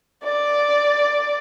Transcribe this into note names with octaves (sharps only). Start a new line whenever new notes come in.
D5